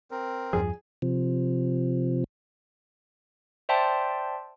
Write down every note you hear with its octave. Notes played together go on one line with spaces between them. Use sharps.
C4 A#4
E2 G2 F3 G#4
C3 F3
C5 D5 E5 G5 A5 C6